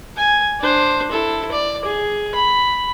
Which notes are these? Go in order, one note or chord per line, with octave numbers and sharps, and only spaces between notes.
G#5
D4 C5
E4 A4
D5
G#4
B5